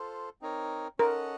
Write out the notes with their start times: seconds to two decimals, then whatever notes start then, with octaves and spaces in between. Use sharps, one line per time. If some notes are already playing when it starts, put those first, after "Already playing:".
Already playing: F4 A4 C5
0.41 C4 D#4 A#4 C#5
0.99 C#4 A4 A#4 D#5 F#5